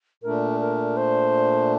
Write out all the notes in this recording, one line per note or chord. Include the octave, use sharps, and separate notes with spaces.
A#2 A3 D4 A#4
A#4
C5